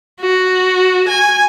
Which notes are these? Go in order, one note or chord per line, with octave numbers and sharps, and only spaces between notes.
F#4
G#5